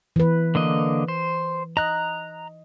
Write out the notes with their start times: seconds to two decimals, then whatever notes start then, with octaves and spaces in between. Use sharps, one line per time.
0.16 E3 B4
0.55 D3 A#3 D#5
1.08 C5
1.77 D#5 A#5 F#6